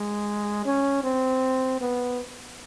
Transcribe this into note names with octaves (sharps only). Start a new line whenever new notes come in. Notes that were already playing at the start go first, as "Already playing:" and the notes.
Already playing: G#3
C#4
C4
B3